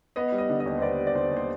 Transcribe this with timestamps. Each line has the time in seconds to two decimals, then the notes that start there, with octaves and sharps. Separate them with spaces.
0.16 B3 D#5
0.32 G3
0.38 D#5
0.49 D3
0.60 D#5
0.66 D#2
0.78 C5
0.82 B3 D5
0.99 G3
1.07 D5
1.15 D3 C5
1.31 D#2
1.37 C5